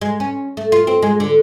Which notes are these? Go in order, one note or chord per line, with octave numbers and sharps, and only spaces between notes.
G#3
C#4
A3
F4
C4
G#3
D3